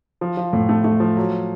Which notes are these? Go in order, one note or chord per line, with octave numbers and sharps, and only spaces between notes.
F3
F3
A2
A3
A3
F3
F#3